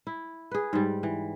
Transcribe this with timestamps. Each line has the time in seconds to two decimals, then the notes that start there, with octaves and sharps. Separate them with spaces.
0.07 E4
0.51 G#4 B4
0.73 G#2 G3
1.03 E3